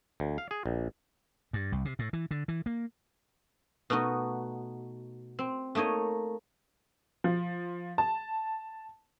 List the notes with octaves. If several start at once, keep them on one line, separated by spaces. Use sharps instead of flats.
D2
F5
G#4
A#1
G2
C2
C3
A2
E3
D3
E3
A#3
B2 A3 B3 D#4 F#4
C4
A3 A#3 D#4 C#5 D#5
F3
A5